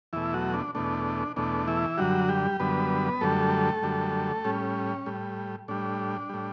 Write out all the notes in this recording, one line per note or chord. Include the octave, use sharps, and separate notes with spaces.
E2 B2 E3 A3 E4
F#3 F#4
D4
E2 B2 A3 D4
E2 B2 A3 D4
E3 E4
F#2 D3 F#3 G3 F#4
G3 G4
F#2 D3 G3 B3 B4
F#2 D3 G3 A3 A4
F#2 D3 G3
A2 G3 C#4
A2 G3
A2 G3 D4
A2 G3